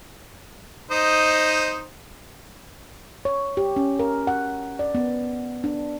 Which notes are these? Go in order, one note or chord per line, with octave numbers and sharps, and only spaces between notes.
D#4 C5 D#5
C#5
G4
C#4
A#4
F#5
D5
B3
D4